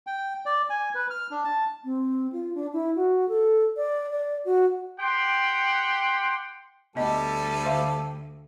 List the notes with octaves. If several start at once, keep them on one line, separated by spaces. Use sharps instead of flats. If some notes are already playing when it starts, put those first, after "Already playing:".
G5
D5
G#5
B4
F6
D4
A5
C4
F4
D4
E4
F#4
A4
D5
D5
F#4
G4 F#5 G5 C6
D2 G3 B3 G4 A4 D#5
D3 E5 F5